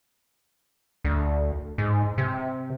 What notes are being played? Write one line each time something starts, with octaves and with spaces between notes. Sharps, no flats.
D2
G#2
C3